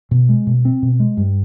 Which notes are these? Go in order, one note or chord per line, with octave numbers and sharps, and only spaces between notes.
B2
G#3
B2
C4
B2
G#3
G2